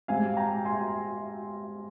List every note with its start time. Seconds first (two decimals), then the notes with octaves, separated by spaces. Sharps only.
0.08 G#2 G3 C4 F5 G#5
0.37 G5 A#5
0.65 G#5 C6